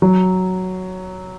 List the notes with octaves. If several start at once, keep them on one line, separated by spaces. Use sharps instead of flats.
F#3